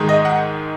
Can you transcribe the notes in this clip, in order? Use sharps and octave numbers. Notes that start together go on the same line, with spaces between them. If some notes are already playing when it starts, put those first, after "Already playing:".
Already playing: G#2 D#3 G#3 D#4
D#5
F#5